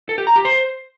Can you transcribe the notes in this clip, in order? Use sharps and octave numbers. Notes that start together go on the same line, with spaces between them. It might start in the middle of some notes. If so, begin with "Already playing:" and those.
A4
G4
A#5
G4
C5